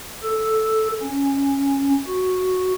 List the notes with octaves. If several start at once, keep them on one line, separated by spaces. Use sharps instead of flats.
A4
C#4
F#4